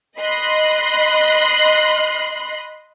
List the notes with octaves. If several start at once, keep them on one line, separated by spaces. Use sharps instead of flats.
D#5 B5 C6 F#6